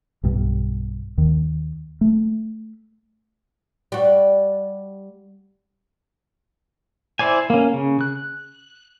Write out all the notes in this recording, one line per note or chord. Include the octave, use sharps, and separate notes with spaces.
B1 G2
D#2 D#3
A3
G3 F#4
E4 C5 D5 G#5
A#3 C#4
C#3
F#6